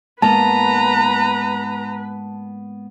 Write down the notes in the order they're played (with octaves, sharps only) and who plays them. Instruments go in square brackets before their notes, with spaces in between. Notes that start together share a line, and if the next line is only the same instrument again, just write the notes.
[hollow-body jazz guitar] G#2 A#3 B3 [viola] B4 [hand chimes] A5 [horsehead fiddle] A#5